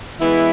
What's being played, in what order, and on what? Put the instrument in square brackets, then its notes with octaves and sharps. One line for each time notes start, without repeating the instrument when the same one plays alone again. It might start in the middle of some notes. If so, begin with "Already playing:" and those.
[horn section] E3 G#3 B3 E4